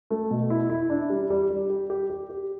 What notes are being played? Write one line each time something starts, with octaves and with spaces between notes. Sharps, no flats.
A3
B2
E4
E4
D4
G3
G3
G3
G4
G4
G4
G4